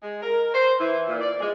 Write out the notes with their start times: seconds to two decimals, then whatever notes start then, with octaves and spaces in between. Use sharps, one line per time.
0.02 G#3
0.22 A#4
0.54 C5
0.79 E3
1.08 A#2
1.21 D5
1.41 G#3